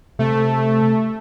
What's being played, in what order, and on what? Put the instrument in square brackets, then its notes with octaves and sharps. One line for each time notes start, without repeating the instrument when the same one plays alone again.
[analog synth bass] C3 [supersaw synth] A3